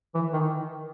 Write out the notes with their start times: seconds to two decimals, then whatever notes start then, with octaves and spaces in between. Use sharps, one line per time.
0.15 E3
0.33 D#3